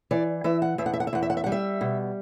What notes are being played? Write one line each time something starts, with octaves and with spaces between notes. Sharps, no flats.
E3 D5
E3 E5
F#5
E2 E5
F#5
E5
F#5
E5
E2 F#5
E5
F#5
E5
F#5
G3
E5
B2